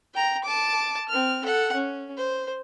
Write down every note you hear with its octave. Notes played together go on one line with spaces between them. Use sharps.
G5 A#5
A5 D6
C4 F6
A4 F#5
C#4
C5